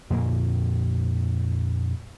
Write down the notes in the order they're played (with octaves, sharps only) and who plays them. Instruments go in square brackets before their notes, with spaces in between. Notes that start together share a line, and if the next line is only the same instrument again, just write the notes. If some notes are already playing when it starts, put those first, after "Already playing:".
[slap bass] F2 A#2 A#3